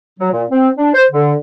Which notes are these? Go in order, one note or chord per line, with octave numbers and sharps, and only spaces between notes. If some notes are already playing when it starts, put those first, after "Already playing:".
F#3
A#2
C4
D4
C5
D3